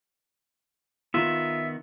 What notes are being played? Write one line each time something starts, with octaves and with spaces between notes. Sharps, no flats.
D#3 B3 F4 E5